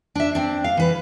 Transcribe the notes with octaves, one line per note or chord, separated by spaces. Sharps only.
D4 E5
C4 D4
F5
E3 B4